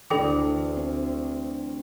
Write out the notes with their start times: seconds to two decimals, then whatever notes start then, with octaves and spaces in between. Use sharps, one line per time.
0.10 D2 E3 D4 A4 G5 D6
0.77 C4